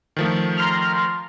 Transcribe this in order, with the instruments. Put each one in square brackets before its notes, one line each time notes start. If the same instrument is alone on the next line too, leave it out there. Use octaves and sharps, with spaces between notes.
[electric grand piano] D#3 F3 A3
[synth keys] A#5 C6 F6